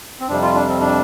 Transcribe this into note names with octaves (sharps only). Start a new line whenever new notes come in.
C4
F2 C3 G3 D4
F4
D4
C4
D4